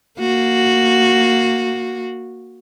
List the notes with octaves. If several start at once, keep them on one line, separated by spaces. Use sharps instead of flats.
A#3 F#4